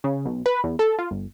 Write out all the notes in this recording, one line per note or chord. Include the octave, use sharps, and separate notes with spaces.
C#3
B1
B4
E2
A4
F4
G1